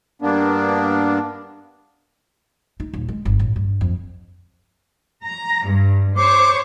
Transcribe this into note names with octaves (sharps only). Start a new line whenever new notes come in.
G2 A#3 B3 D4
D#4
D#1
G#3
G1
A1
G2
F2
A#5
G2
C5 C#5 C#6 D6